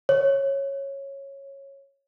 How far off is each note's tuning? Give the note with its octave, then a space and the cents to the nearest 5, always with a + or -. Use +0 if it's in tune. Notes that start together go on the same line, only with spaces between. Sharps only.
C#5 -10